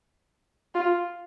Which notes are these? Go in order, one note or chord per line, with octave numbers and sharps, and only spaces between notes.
F4